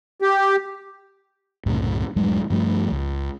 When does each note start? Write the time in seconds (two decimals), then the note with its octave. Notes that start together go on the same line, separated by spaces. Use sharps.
0.21 G4
1.66 C2 F#2 A2 C#3
2.16 D#1 G2 F#3 G#3
2.50 G2 F3 G3 A3
2.92 C#2